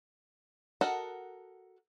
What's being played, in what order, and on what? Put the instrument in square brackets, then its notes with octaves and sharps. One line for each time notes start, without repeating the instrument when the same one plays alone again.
[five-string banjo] F#4 A4 A#4 D#5 F#5